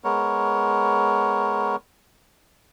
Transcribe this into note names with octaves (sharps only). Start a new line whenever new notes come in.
G#3 B3 A#4 C#5